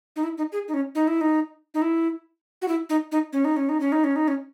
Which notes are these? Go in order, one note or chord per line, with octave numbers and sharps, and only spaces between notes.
D#4
E4
D#4
G#4
D#4
C#4
D#4
E4
D#4
D#4
E4
F#4
E4
D#4
D#4
C#4
D#4
C#4
D#4
C#4
D#4
C#4
D#4
C#4